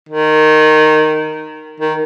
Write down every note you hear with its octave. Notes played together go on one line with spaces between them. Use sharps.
D#3
D#3